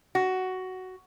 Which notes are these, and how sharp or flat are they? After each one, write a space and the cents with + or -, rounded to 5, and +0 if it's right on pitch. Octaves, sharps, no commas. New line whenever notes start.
F#4 +10